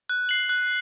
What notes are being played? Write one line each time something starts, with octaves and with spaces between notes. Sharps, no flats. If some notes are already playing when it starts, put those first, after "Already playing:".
F#6
C7 F#7
F#6